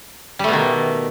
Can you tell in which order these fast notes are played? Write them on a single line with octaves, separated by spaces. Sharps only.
G3 A3 B2 D#3